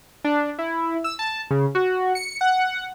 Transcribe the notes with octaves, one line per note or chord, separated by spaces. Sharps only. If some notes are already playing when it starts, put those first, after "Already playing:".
D4
E4
E6
A5
C#3
F#4
C#7
F#5